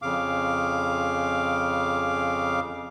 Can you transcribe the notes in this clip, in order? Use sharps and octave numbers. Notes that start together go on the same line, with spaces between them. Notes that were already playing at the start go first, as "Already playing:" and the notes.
F2 C#3 F5 D6